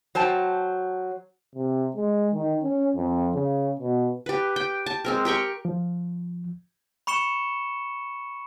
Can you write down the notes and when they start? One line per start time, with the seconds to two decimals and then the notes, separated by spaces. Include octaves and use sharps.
0.15 F#3 C5 G5 A5
1.55 C3
1.96 G#3
2.33 D#3
2.63 C#4
2.96 F2
3.34 C#3
3.80 B2
4.26 G4 B4
4.56 G5
4.86 A5
5.05 G#3 C4 A#4
5.25 G4 A#4 G5 C#6
5.65 F3
7.07 B5 C#6 C#7 E7 G7